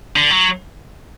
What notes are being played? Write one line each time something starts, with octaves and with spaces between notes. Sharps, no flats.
D3
F#3